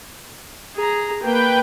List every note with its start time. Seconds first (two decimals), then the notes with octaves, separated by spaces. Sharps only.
0.75 G#4 A#5
1.22 A#3 B4 G5